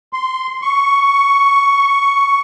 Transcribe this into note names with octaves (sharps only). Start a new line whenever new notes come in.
C6
C#6